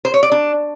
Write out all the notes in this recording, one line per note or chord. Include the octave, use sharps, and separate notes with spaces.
C5
C#5
D5
D4